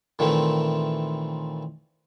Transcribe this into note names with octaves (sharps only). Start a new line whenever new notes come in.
A#2 D#3 E3 A3 C4